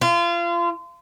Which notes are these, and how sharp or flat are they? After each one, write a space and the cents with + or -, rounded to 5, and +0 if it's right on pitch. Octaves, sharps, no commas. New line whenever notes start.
F4 -30